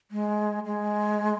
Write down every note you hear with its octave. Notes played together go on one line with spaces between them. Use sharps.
G#3
G#3